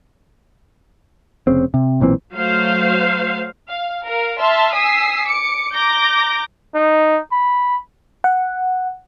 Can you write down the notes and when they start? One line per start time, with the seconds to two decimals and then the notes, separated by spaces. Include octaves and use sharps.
1.47 F1 C#3 C4
1.74 C3
2.00 B1 A#2 E3 C4
2.34 F#3 A3 C5 F5
3.68 F5
4.03 A#4 F5
4.39 E5 A5 C6 E6 F6
4.73 G#5 D#6 E6 B6 C7
5.24 D6 C#7
5.74 A#5 D6 G6 A#6
6.75 D#4
7.32 B5
8.24 F#5